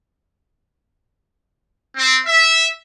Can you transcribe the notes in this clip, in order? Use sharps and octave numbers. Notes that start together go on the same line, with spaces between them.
C4
E5